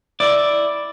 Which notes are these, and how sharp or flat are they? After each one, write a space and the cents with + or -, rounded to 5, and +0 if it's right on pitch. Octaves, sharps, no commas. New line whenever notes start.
E4 +0 D5 +0